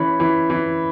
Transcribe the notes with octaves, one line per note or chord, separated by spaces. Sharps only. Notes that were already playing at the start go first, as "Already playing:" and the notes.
Already playing: E3 C#4 B5
E3
E3